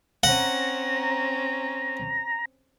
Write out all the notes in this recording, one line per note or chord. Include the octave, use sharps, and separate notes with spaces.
C4 C#4 F#5 A#5